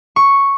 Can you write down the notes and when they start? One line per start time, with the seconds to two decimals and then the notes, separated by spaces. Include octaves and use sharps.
0.16 C#6